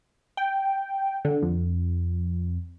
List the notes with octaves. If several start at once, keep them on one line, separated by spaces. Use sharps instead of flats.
G5
D3
F2